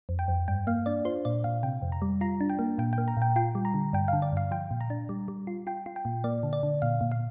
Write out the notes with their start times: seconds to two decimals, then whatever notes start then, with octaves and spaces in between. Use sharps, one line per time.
0.09 F2
0.19 G5
0.28 F2
0.48 G2 G5
0.67 A#3 F5
0.86 D4 D5
1.05 F4 C5
1.25 A#2 D5
1.44 A#2 F5
1.63 C3 G5
1.82 F2
1.92 A#5
2.02 G3
2.21 F4 A#5
2.41 D4
2.50 G5
2.59 A#3
2.78 A#2 G5
2.93 G5
2.98 A#3
3.08 A#5
3.17 A#2 G5
3.36 F4 G5
3.55 G3
3.65 A#5
3.74 D3
3.93 G2 G5
4.08 D3 F5
4.22 D5
4.32 G2 F5
4.51 F3 G5
4.71 A#2
4.81 A#5
4.90 D4
5.09 G3
5.28 G3
5.47 F4
5.67 F4 G5
5.86 F4
5.96 G5
6.05 A#2
6.24 A#3 D5
6.43 D3
6.53 D5
6.63 D3
6.82 A#2 F5
7.01 A#2
7.12 F5